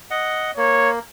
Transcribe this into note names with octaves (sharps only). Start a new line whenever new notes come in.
D#5 F#5
A#3 C#5